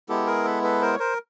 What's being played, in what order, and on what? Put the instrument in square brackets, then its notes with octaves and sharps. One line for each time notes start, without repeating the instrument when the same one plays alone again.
[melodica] G#3 B3 E4 G4 A4
G#4 A#4
A4 B4
A4 B4
A#4 C5
C#5
A#4 C5